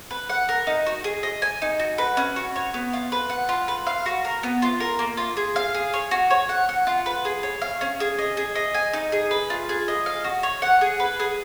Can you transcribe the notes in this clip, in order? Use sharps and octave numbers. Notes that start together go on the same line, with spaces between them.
B4
F#5
A#4
D#4
F#4
G#4
D#5
G#5
D#4
F#4
B4
C#4
F#4
C#5
B3
F4
B4
F#5
F4
B4
F5
F#4
A#4
B3
F4
A#4
A#3
F4
G#4
F5
G#4
C#5
F#4
C#5
F#5
F#5
F4
B4
G#4
C#5
F5
C#4
G#4
D#5
G#4
D#5
G#5
D#4
G#4
B4
F4
G#4
D#5
F5
F#4
C#5
F#5
G#4
B4
G#4